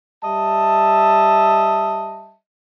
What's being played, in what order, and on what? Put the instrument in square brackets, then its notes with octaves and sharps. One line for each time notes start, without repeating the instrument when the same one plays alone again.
[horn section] G3 D#5 E5 A5